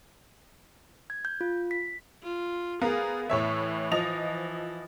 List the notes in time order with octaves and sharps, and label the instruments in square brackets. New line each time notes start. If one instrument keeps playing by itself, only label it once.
[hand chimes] G#6
G6
F4
B6
[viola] F4
[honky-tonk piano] B3 A#4 F5 [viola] G#4
[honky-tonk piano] A2 C#5 E5 [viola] E3
[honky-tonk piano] F3 D#5 F7